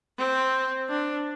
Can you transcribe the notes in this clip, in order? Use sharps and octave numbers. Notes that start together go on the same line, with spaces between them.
C4
D4